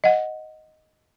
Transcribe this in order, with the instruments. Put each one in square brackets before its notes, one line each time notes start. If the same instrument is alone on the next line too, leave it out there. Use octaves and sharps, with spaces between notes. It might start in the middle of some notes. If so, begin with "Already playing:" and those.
[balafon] D#5 F#5